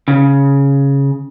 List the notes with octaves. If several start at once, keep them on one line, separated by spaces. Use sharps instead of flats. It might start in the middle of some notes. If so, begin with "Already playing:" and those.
C#3